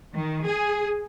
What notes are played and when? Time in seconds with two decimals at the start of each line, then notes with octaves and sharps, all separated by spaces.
0.14 D#3
0.44 G#4